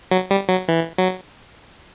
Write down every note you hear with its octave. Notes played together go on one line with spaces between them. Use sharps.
F#3
G3
F#3
E3
F#3